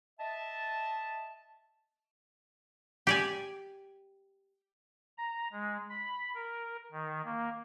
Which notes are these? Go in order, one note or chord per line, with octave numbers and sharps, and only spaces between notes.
D#5 E5 A5
G4 D5 G#5
A#5
G#3
B5
A#4
D#3
A#3